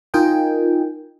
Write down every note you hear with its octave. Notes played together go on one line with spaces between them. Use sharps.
D#4 F4 A#4 D#5 G5 G#5